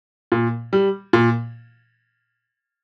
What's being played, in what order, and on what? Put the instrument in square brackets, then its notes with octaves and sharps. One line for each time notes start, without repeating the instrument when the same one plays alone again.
[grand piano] A#2
G3
A#2